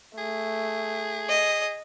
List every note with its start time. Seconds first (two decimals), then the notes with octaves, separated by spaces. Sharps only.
0.18 A3 G#4
1.29 D#5